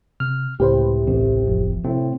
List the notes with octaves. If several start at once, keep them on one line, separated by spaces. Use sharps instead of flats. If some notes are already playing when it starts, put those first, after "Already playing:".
C3 F6
C#2 A2 C3 G4 B4 C5
A1 C4
F1 F3
A2 C3 C4